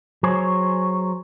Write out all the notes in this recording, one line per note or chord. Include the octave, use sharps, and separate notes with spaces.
F#3 G#4 C5 C#5